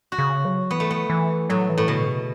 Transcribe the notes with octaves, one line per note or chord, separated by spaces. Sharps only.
F#4
C#3
F#3
E3 B3
A3
B3
E3
A2 F#3
E3
A2
B2 D3
C#3